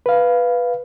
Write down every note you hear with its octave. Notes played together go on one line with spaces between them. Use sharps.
B4 F5